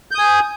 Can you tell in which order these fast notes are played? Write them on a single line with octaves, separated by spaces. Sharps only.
G6 D#6 G#5